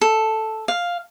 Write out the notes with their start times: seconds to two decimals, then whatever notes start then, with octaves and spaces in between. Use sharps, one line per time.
0.01 A4
0.68 F5